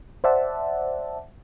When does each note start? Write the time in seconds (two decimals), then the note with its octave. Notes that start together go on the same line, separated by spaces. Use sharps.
0.24 C5 D5 E5 F#5 A5